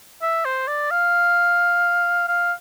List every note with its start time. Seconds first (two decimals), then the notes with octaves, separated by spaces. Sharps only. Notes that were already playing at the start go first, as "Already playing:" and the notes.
0.22 E5
0.45 C5
0.68 D5
0.91 F5
2.28 F5